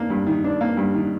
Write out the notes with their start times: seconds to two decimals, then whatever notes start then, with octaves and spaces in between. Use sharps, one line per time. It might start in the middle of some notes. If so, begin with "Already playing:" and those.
Already playing: D#3 A#3 D4
0.10 G2
0.27 D#3
0.44 D4
0.61 A#3
0.77 G2
0.94 D#3